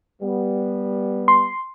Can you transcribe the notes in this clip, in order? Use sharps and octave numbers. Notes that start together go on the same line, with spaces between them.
G3 B3
C6